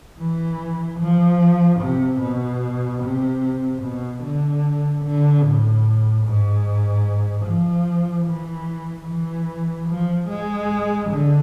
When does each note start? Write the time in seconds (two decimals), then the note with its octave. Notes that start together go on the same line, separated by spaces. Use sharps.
0.20 E3
1.00 F3
1.80 C3
2.21 B2
3.03 C3
3.83 B2
4.24 D3
5.04 D3
5.44 A2
6.26 G#2
7.46 F3
8.27 E3
9.08 E3
9.89 F3
10.29 G#3
11.10 D3